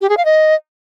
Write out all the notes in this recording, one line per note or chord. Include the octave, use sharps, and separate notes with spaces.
G4
G#4
F5
D#5